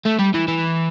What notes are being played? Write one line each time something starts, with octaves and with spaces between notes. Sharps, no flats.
A3
G3
E3
E3